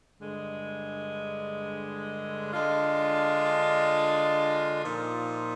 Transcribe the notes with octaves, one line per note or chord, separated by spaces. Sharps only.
G2 D3 G#3
D3 G#3 D4 F4
A#2 F3 A#3 D#4